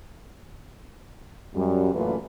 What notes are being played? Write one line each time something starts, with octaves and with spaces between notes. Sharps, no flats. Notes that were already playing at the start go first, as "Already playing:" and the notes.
F#2 G3
F#2 A#2 E3 A3 F4 B4